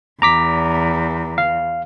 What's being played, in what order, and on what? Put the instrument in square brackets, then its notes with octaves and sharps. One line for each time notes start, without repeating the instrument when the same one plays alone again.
[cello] E2 [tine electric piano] A#5 D6 B6
[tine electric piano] F5